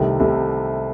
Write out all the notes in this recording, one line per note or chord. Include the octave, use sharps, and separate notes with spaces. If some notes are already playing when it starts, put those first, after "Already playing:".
Already playing: C2 C3 D#3 A3
C2 C3 D#3 A3